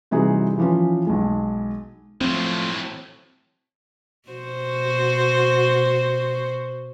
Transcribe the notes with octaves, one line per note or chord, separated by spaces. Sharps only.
C3 E3 G3 D#4 F#4 G#4
E3 F3 C#4
B1 G#3
A2 F3 F#3 A3 C4 C6
B2 F#4 C5